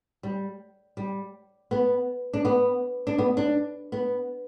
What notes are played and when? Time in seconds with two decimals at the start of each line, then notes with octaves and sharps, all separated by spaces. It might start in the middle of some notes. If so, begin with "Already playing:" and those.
0.23 G3
0.97 G3
1.71 B3
2.33 D4
2.45 B3
3.07 D4
3.19 B3
3.37 D4
3.92 B3